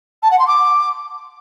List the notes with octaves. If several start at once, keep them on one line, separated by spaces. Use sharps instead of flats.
A5
F#5
C6
D6